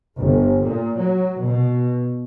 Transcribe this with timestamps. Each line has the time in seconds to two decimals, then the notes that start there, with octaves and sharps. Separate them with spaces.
0.18 G1
0.64 A#2
0.98 F#3
1.39 B2